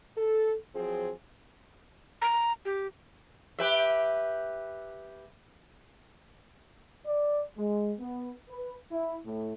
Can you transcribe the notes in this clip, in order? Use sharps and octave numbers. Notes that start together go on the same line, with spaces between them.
A4
F3 F#3 C4 G#4
A#5
G4
G4 B4 E5
D5
G#3
B3
B4
E4
A2